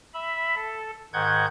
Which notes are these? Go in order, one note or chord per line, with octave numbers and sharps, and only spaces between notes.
E5 B5
A4
G#2 D#3 F#5 G6 G#6